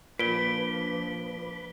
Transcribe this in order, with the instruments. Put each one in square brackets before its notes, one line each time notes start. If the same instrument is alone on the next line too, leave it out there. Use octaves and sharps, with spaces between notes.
[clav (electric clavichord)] A#2 [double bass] F3 D4 [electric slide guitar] B4 [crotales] D7 G7